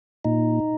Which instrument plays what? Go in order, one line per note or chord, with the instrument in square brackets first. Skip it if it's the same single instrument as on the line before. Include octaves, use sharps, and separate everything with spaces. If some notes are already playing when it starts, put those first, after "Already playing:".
[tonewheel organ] A#2 D#4